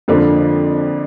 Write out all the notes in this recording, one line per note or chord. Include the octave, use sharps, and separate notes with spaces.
F2 D3 F3 A#3 D4